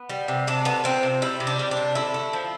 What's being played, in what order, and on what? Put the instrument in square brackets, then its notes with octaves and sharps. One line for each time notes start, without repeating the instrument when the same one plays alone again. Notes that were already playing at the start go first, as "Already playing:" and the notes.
Already playing: [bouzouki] B3
G3
C3
C3 D4
A3 B3
F3 C4
C3
G3 E4
C3
D4
G3
D4
C3
D3 E4
A3
F3